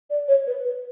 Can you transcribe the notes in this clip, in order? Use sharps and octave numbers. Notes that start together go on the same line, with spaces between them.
D5
C#5
B4
B4